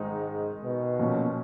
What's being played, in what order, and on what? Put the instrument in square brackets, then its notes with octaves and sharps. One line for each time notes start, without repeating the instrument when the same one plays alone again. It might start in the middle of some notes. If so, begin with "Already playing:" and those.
Already playing: [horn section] G#2 [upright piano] D#3 G#3 D#4
[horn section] B2
[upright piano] A#2 F3 A#3 C#4 F4